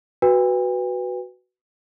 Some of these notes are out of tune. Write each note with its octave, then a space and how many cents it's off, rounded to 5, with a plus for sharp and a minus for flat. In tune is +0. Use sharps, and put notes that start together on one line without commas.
F#4 +0 B4 +0 G5 +45